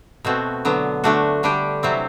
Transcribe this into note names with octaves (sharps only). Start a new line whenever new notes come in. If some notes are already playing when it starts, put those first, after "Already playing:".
B2 A3 C4 F#4
D3 F#3 B3
D3 A3 D4 F#4
D3 G3 D4 G4
C3 F#3 C4 E4